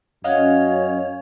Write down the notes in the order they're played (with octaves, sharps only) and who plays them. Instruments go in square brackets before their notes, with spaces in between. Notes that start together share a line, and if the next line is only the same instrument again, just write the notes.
[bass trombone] F#2 [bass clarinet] C#4 [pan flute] C#5 [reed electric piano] D#5 F5 F#5